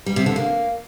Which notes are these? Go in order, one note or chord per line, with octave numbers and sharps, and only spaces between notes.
G3
C3
D3
A#3